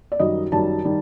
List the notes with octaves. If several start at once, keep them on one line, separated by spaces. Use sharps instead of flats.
D5
F#2 D#3 G3 D#5
F#2 D#3 G3 A5
D#3 G3